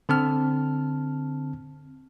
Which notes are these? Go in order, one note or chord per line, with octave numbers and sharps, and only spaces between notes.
D3 C4 A5 F6